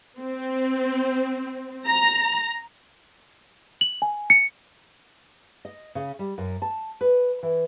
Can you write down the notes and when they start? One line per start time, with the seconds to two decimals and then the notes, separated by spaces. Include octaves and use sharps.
0.18 C4
1.88 A#5
3.81 F#7
4.02 G#5
4.30 C#7
5.65 D#5
5.95 C#3
6.19 G3
6.38 F#2
6.62 A5
7.01 B4
7.43 E3